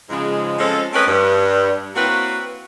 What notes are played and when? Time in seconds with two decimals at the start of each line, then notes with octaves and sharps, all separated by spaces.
0.09 G#2 C#3 F3 G#3
0.59 F3 G#3 C4 C#4 A4
0.93 A3 C4 C#4 A#4 B4 D#5
1.07 G2
1.95 A#3 C4 E4 F#4 B4 C#5